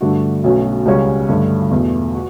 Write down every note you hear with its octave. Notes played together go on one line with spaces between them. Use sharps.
G2 D3 A3 D4 F#4
B1 B2 A3 C#4 F#4
C#2 C#3 G3 C#4 F#4
G2 D3 A3
E2 B2 A3
F#4